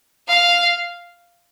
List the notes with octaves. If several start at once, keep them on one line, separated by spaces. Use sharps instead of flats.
F5